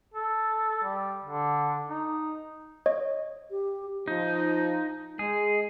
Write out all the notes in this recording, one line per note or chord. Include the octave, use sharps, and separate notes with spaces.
A4
G3
D3
D#4
C#5 D#5
G4
F3 D#4
G#3 G#4